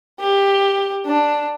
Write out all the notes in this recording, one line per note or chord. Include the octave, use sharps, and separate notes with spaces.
G4
D4